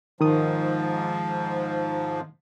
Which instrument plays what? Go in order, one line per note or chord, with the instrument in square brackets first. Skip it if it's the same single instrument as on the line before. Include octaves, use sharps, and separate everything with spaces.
[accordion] G#2 F3 [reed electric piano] D#3 D#6